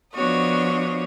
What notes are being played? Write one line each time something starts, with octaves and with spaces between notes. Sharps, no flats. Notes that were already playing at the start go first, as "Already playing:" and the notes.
F3 B3 D4 F#4 C#5 D#5